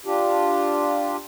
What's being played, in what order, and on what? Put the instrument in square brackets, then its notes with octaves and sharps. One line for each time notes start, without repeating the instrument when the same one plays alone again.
[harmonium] D4 F4 G4